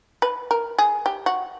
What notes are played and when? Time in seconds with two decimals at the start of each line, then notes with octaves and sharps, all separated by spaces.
0.22 B4
0.51 A#4
0.79 G#4
1.06 G4
1.26 F#4